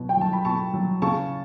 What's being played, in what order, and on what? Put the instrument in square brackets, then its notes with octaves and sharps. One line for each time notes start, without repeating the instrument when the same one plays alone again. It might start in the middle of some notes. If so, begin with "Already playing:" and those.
Already playing: [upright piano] B2 F#3
G5
F#3 A5
B5
B2 A5 C#6
F#3
C#3 A5 C#6